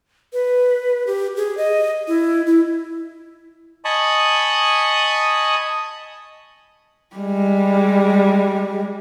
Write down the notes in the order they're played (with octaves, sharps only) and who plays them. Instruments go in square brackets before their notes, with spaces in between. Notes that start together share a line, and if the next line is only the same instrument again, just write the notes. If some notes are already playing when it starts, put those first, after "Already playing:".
[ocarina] B4
G4
G#4
D#5
E4
E4
[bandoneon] D#5 G#5 A5 B5 C#6 D#6
[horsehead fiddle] G3 G#3